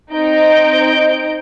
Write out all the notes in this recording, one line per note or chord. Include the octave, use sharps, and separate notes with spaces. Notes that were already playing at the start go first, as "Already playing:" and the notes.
C4 D#4 C5 G6 D7